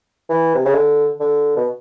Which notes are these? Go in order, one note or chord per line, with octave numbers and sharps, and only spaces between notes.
E3
C3
C#3
D3
D3
B2